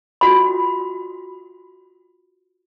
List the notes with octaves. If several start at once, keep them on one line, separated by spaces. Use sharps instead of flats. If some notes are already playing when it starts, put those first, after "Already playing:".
F4 F#4 B5